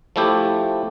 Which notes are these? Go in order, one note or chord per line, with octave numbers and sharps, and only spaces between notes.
F3 A3 E4 G4